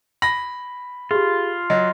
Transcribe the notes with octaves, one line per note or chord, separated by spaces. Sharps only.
B5 A#6
F4 G4 G#4
F#3 D#5